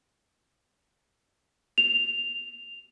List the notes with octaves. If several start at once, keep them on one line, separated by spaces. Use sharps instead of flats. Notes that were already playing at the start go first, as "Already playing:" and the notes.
F7